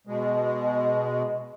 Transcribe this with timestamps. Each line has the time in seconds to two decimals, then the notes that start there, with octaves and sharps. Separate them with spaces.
0.07 B2 G#3